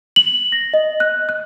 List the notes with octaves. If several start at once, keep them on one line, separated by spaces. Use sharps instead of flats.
F#7
A#6
D#5
F#6
F#6